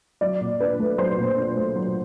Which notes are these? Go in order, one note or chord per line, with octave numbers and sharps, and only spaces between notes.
F#3 D5
A#2
D4 B4
A3
F#3 C5
A#2
D4
A3
F#3